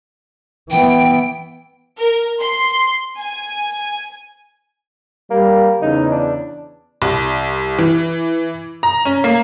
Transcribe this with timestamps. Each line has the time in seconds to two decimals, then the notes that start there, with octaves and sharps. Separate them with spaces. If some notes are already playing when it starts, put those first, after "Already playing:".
0.71 E3 B3 G5
1.97 A#4
2.40 C6
3.17 G#5
5.31 G3 A#3
5.82 E2 C#3 D#4
6.12 D4
7.02 C2
7.78 E3
8.83 A#5
9.05 C#4
9.24 A#3